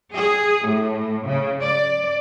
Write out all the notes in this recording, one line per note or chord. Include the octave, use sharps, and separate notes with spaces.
G#4
A2
C#3
D5